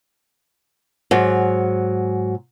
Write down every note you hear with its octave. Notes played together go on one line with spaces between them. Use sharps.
G#2 F#3